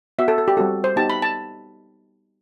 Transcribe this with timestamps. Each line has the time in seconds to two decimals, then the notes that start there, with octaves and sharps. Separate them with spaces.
0.18 B3 F#4 E5
0.28 A4
0.38 A4
0.48 G4
0.57 G3 C4 F#4 A4
0.84 C5
0.96 B3 D#4 G4 A5
1.10 B5
1.22 A5